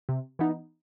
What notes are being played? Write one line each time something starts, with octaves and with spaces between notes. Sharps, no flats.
C3
E3 B3 D#4